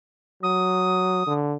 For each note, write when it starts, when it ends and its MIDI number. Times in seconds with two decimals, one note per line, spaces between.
0.43 1.23 54
0.43 1.33 87
1.27 1.57 50